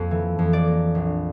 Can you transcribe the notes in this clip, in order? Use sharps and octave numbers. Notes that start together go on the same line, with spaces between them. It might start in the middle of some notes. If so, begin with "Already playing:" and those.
Already playing: F2 A#3
E3
F2
D5
A#3
A#1